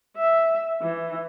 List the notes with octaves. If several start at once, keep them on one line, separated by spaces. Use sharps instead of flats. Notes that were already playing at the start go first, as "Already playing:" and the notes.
E5
E3